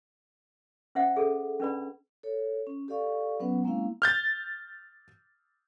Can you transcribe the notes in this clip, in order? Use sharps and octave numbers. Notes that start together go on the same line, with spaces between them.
C#4 C5 E5 F#5
G#4 A4
C#4 D4 B4 D5 B5
A4 C#5
C#4
G4 A4 D5 F5 C#6
F#3 B3 C#4 B4 F#5
G#3 A#3 C4 C#4 E4 F5
F6 G6 A6